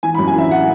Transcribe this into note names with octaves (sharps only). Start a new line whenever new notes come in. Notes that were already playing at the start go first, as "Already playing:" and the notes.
E3 G#5
B5
F#2
G#5
E3 E5
F#5